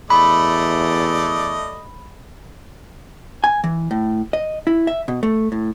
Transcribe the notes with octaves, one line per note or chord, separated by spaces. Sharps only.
E2 A3 D5 D#5 B5
G#5
E3
A2
D#5
E4
E5
B2
A3
A2